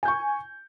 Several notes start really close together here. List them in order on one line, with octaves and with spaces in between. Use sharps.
G#5 G6 C#6